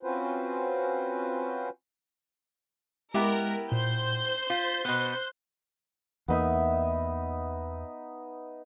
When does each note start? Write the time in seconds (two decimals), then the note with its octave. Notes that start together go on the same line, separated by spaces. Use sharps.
0.03 C4 C#4 F4 F#4 B4 C5
3.14 G#3 B3 E4 G4 A#4
3.72 A#2 C5 G6
4.50 F4 B6
4.85 B2 B3 F#6
6.28 E2 A#3 B3 D#4 E5